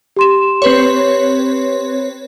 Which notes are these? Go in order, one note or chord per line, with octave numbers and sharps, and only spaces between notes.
G4 C6 E7
C4 B4 C#5